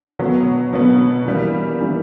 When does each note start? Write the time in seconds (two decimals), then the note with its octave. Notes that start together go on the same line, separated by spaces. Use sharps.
0.19 B2 F#3 B3
0.73 B2 F#3 B3
1.26 E3 G3 A#3
1.80 E3 G3 A#3